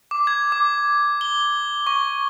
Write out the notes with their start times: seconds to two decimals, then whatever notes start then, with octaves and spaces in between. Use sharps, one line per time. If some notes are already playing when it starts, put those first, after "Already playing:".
0.11 D6
0.27 G#6
0.52 D6
1.21 G7
1.87 C#6